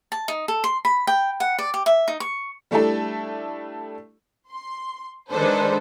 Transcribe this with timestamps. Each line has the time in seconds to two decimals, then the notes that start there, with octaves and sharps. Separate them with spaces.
0.12 A5
0.28 D#4
0.48 A4
0.64 C6
0.85 B5
1.07 G5
1.40 F#5
1.59 D5
1.74 G4
1.86 E5
2.08 D#4
2.20 C#6
2.71 G3 A3 D4 E4 A4
4.52 C6
5.30 D#3 G#3 D4 A4 B4 C5